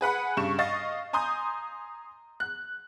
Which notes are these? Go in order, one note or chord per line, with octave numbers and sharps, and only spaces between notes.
G#4 B4 F#5 B5
G2 C#3 C#6 E7
D#5 F5 C#6 A6
G#5 A#5 C6 D#6 G6
F#6